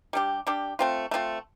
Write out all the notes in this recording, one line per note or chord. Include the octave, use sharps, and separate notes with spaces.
G3 D4 G4
G3 D4 G4
A3 C4 F4
A3 C4 F4